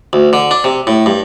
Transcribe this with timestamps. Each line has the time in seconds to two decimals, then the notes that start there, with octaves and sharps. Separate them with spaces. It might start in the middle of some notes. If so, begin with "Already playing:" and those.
0.13 D2
0.33 D3
0.51 D4
0.64 C3
0.87 A2
1.06 G2